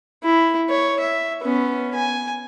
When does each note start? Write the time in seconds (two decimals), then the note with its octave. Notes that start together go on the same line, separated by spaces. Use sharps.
0.24 E4
0.70 C#5
0.99 E5
1.42 B3 C#4
1.95 G#5